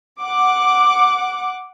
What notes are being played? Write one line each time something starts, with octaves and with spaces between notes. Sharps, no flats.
F#5 D6